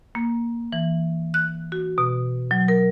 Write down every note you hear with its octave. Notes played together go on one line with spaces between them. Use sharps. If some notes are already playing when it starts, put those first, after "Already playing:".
A#3
E3
F#6
F#4
B2
F#3
A#4